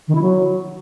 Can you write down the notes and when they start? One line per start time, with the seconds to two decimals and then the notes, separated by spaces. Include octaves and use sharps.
0.07 D#3
0.14 E4
0.21 F#3